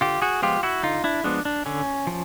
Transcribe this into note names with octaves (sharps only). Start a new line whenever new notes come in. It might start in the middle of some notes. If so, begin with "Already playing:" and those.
D3 F4 G4
F#4 G#4
F3 G#3 B3 F4 G4
E4 F#4
D3 D#4 F4
D4 E4
F3 G#3 B3 D4
D4
D3 C#4
F3